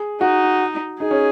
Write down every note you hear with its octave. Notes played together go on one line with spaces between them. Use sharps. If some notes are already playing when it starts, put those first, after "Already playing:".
Already playing: G#4
D#4 F#4
D#4 G#4
C#4